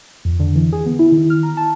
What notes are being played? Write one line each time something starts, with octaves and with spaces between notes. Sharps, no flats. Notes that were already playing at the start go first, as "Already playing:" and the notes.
F2
D3
E3
G#4
B3
E4
D#3
F6
A#5
A5